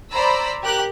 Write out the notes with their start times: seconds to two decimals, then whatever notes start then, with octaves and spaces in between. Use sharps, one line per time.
0.14 C5 D5 A#5 B5 E6
0.62 G4 A#4 F#6